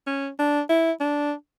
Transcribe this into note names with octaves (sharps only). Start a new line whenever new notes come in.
C#4
D4
E4
D4